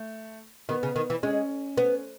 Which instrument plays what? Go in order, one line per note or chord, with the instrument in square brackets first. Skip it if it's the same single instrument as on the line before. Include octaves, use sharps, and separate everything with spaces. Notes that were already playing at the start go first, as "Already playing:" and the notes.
Already playing: [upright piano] A3
[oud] D#3 [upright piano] B3
[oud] C#3
D#3
E3
[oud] G#3 [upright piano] C#4
[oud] B3